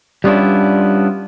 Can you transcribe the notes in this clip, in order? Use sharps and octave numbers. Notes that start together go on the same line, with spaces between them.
G3 B3 C#4 D4 E4 F4